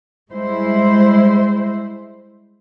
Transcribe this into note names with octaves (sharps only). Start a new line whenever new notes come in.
G3 G#3 E4 C5